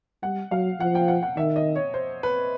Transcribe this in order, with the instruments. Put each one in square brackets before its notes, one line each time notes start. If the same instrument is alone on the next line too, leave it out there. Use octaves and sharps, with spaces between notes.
[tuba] G3 [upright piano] F#5
[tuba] F#3 [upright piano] F5
[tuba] F3 [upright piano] F#5
[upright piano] G5
F#5
F#5
[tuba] D#3 [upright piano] E5
[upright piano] D#5
C#5
C5
B4